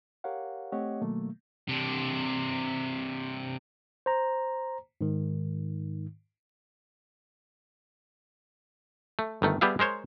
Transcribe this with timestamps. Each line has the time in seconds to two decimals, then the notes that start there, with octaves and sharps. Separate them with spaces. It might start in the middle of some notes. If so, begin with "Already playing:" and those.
0.24 G4 A#4 C#5 F5 F#5
0.72 A3 C4 G4 C#5 D#5 F#5
1.02 B2 D#3 F#3 A3 A#3
1.69 C3 D4
4.06 C5 A#5
5.01 G#2 D#3
9.19 A3
9.42 G1 D#3 A3
9.61 G3 B3 G4 G#4 E5 F5
9.79 G#3 A#4 C5 C#5